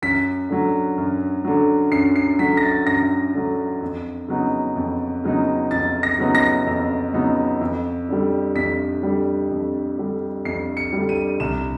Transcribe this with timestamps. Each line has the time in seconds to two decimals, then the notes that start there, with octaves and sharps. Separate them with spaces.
0.02 F#2 B6
0.49 D3 F#3
0.98 F#2
1.45 D3 F#3
1.91 F#2 C7
2.16 C7
2.39 D3 F#3 B6
2.57 A#6
2.63 A6
2.87 F#2 A#6
3.34 D3 F#3
3.82 F2
4.28 C#3 F#3 B3 D#4
4.76 F2
5.24 C#3 F#3 B3 D#4
5.71 F2 A6
6.03 A#6
6.19 C#3 F#3 B3 D#4
6.35 A#6
6.67 F2
7.14 C#3 F#3 B3 D#4
7.61 F2
8.09 D3 G3
8.55 F2 B6
9.03 D3 G3
9.51 F2
9.98 D3 G3
10.45 F2 C7
10.77 C#7
10.93 D3 G3
11.09 D#7
11.40 C2 E7